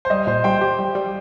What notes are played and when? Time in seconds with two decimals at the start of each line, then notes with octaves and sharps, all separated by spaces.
0.05 C5
0.10 G3 D#5
0.27 A#2 C5
0.44 G3 G5 C6
0.61 G4
0.79 G3
0.95 G3